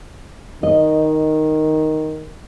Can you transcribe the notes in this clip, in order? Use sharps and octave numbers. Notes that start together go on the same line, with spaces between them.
D#3 D#5